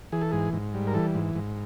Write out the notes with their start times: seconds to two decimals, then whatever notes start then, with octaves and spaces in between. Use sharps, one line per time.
0.12 E3 G#4
0.21 A4
0.31 G#2 G#4
0.53 G#2
0.74 G3
0.87 A#4
0.94 E3 A4
1.15 G#2
1.35 G#2